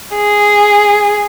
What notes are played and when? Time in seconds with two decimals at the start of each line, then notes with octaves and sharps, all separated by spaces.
0.15 G#4